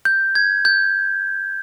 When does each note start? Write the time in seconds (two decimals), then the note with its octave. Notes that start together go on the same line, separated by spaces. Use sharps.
0.05 G6
0.35 G#6
0.65 G6